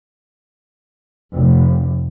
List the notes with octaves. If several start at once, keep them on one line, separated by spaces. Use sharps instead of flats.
F1